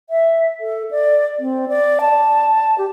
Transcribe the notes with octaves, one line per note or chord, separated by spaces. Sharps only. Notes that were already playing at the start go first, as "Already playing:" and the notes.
E5
A4
D5
C4
D5
A5
G4